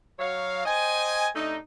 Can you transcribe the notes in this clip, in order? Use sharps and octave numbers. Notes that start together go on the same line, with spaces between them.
F#3 C#5 F5
C5 D#5 G5 G#5
C3 A3 D4 D#4